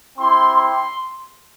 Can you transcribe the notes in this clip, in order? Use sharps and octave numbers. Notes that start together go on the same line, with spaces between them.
C4 E4 G4 C6
C6